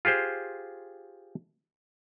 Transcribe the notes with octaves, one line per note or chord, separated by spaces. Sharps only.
F4 G4 G#4 C5